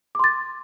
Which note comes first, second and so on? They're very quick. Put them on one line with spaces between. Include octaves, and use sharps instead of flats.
D6 C6 A6